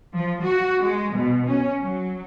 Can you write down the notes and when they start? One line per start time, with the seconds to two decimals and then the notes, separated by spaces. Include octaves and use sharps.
0.14 F3
0.43 F#4
0.82 G#3
1.15 B2
1.48 C#4
1.81 F#3